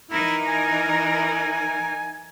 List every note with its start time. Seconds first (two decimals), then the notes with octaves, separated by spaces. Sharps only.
0.11 E3 D#4 E4 A#4
0.48 G#5